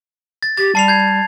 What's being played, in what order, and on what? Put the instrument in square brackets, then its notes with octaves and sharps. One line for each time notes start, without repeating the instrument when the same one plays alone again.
[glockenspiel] A6
[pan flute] G4 [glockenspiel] A6
[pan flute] G3 [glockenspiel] A5 C7 F7
[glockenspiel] G6 G#6 C7